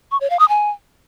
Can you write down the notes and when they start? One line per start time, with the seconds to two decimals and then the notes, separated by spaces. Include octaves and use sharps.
0.11 C#6
0.21 C#5
0.30 F5
0.39 D#6
0.49 G#5